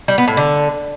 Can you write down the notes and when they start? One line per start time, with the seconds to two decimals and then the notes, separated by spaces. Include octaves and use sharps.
0.08 G3
0.18 B3
0.28 A2
0.37 D3